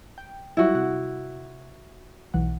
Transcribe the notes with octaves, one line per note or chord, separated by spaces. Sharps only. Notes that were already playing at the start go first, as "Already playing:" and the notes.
G5
F#3 G3 E4 F#4
C3 F#5
B1 E3 F#5